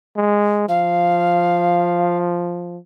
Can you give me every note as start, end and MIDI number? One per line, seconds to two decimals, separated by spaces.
0.16 0.66 56
0.68 2.77 53
0.68 2.18 77